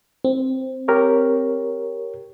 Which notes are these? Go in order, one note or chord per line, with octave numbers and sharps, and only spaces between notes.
C4
G4 A#4 C#5